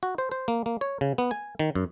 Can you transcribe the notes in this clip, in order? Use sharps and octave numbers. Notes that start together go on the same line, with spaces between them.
F#4
C5
C5
A#3
A#3
C#5
C#3
B3
G#5
D#3
F#2